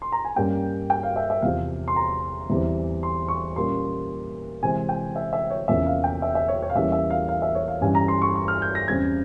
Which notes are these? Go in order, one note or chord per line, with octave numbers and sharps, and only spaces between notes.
C6
A#5
G#5
G2 G3 A#3 C#4 G5
G5
F5
E5
E5
E2 C3 F3 F5
C6
A#5
E2 E3 G3 C4
C6
C#6
A#2 G3 A#3 C#4 C6
C3 E3 G#3 C4 G#5
G5
E5
E5
C#5
E2 C3 F3 A#3 C#4 E5
F5
G5
E5
E5
C#5
C#5
F5
E2 E3 G3 A#3 C#4 E5
E5
F5
F5
E5
C#5
F5
G2 E3 G3 C#4 G#5
A#5
C6
C#6
C#6
F6
G6
A#6
E2 C#3 G3 C4 G#6